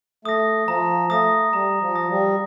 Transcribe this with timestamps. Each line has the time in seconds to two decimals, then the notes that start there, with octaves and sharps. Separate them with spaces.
0.25 A3 D#6 A#6
0.67 F3 A#5
1.10 A3 D#6 A#6
1.53 G3 A#5
1.81 F3
1.95 D#6 A#6
2.10 G3